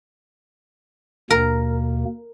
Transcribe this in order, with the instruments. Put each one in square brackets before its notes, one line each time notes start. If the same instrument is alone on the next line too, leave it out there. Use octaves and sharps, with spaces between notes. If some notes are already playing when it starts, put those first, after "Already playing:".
[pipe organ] D#2 B2 A#3 [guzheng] A#4